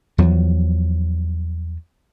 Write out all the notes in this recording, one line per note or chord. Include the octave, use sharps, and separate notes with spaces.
E2 F3 F#3